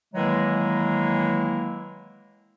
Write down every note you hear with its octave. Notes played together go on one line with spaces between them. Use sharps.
D#3 E3 F#3 G#3 A#3 E4